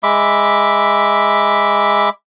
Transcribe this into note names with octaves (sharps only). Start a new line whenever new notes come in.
G#3 E5 B5 D6